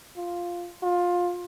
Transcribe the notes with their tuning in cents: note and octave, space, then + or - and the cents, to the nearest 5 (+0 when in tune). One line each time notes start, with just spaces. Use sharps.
F4 +0
F4 +20